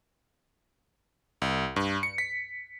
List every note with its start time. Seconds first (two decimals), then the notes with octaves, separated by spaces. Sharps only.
1.42 C2
1.76 G2
2.03 C#7
2.18 B6